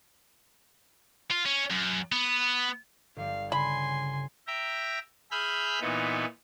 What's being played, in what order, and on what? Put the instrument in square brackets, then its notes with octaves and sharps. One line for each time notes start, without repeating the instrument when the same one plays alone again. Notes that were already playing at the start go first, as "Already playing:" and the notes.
[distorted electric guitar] F4
C#4
F#2
B3
[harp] G1 G3 [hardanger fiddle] F5
[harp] C#3 [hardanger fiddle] G#5 C6 [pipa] B5
[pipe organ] E5 G5 A#5
G#4 E5 B5 F6 G6
A#2 E3 B3 D#4